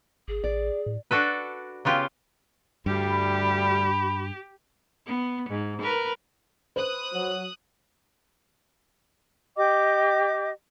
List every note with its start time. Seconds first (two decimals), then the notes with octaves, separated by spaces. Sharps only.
0.28 G#1 G#4
0.44 A1 D5
0.86 A2
1.11 D4 F#4 A4 B4
1.85 C#3 B3 F4 G4
2.86 D2 G2 G3 G4 B5
5.06 B3
5.50 G#2
5.82 A#4 B4
6.76 B4 C5 D#6 F#6
7.13 F#3
9.57 G4 D#5 G5 D6